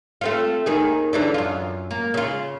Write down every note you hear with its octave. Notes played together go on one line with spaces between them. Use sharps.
A3 C4 F4
D#2 D#3 G#4
D3 E3 D4
F#2 F4
A#3
C#3 F4